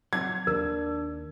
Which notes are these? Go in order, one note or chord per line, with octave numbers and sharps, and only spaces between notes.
F#3 G#6
D#2 D4 A#4